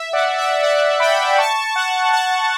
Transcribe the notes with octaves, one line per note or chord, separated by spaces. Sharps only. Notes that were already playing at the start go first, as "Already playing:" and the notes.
Already playing: E5
D5 F#5
E5
D5 F#5
G5 B5
A5 C#6
F#5 A5
F#5 A5